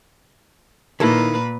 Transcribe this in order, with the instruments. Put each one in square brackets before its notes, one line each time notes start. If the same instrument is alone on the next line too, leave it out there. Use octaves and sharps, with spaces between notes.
[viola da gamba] A#2 A#3 B4 [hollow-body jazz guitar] D#3 E4 A4